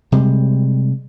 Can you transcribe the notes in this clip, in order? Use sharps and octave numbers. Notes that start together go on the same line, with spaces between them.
C3 G3 G#3